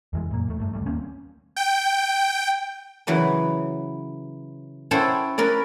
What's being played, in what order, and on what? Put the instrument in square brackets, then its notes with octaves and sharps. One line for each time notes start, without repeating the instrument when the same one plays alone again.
[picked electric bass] F2 E3 G#3
F#2 A#2 A#3
E2 A3
G2 A3
D2 F#3 G3 A3
D#2 A#3 C4 C#4
[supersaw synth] G5
[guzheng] C#3 E3 F#3 B4
C#4 E4 A4 C5 F#5 G5
C#4 A#4 B4 D5